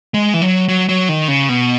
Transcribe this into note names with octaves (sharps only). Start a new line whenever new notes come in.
G#3
E3
F#3
F#3
F#3
D#3
C#3
B2